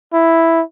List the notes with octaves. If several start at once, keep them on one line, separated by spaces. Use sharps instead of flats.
E4